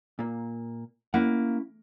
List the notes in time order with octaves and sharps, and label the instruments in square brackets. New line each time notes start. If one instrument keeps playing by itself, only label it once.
[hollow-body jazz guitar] A#2 A#3
[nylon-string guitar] A#3 [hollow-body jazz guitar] C#4 E4 F#5